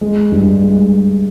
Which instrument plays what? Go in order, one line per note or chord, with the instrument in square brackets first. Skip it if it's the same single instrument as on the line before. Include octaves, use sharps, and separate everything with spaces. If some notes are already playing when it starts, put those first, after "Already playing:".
[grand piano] G#3
G2
G#3